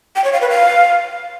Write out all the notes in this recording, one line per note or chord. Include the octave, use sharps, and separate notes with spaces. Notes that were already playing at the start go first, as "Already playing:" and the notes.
G5
C#5
F5
B4
F5